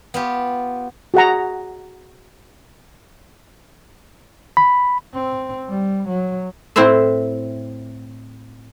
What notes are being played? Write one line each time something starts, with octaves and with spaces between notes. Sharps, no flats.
B3 F4 G4
F#4 G#4 F#5 A#5
B5
C4
G3
F#3
A2 C4 E4 C5 E5